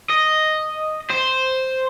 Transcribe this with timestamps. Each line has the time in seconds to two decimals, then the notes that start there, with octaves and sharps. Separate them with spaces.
0.09 D#5
1.10 C5